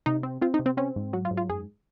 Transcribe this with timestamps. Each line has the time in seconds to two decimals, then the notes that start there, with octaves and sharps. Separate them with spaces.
0.06 C3 D#4
0.23 C4
0.42 C4 F4
0.54 D#4
0.59 C3
0.66 C4
0.77 C4 C#4
0.96 G#2
1.13 F#3 F#4
1.25 F4
1.31 G#2
1.37 F4
1.49 F#2 G#4